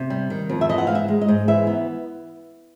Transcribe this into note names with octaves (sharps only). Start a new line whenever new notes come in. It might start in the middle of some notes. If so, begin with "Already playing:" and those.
Already playing: C3
G3
D#3
F2
E5
E3 D#5
F#5
G#2 F5
E5
G#3
D#5
G#2
E3 E5
B3